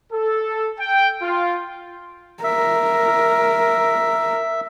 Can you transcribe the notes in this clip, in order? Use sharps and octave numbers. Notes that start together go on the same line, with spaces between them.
A4
G5
F4
A#4 E5